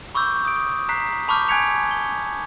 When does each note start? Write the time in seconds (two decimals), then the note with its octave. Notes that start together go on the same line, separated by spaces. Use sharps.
0.15 B5 C#6 D6 E6 G6
0.45 D#6 D7
0.89 A#5 F#6 B6 C7
1.28 A5 B5 C#6 D6 F6 G6
1.48 G#5 F#6 G#6 B6 C#7 F7
1.91 G7